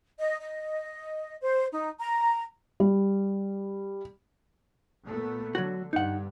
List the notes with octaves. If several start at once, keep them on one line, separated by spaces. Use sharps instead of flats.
D#5
D#5
C5
D#4
A#5
G3
A#2 A3 B3
D3 F#3 F#4
G2 D#4 F#5